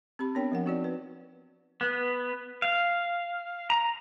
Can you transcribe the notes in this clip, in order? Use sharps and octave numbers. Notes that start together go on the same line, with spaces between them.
C4 G4 B5
B3 D4 A#4 C#5 G5
F3 A#4 F#5
C4 D#4 F#4 C#5 D5
B4
B3
F5
A#5